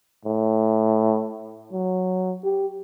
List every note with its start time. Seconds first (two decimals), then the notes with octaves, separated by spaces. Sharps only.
0.25 A2
1.72 F#3
2.44 G4